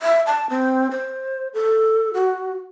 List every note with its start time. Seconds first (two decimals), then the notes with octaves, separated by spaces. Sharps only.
0.02 E5
0.27 A5
0.50 C4
0.91 C5
1.54 A4
2.14 F#4